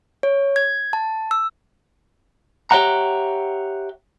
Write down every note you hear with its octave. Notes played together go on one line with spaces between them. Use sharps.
C#5
G#6
A5
E6
G4 C#5 E5 F#5 A#5